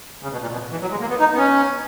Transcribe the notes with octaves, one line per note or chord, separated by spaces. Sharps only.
C#3
B2
A#2
B2
E3
F#3
G#3
A#3
B3
D#4
B3
C#4